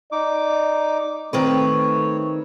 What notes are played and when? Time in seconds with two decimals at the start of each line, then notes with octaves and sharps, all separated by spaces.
0.12 D#4 D5 D6
1.33 D#3 A3 C4 B4 C#5